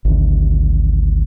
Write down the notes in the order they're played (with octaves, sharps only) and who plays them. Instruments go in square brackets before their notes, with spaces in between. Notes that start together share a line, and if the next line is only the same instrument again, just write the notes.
[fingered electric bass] G#1 D2